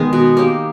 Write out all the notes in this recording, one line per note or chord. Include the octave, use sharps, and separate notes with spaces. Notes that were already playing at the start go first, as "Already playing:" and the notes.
Already playing: D#3 G#3 B3
B2
A#3 D#4 G4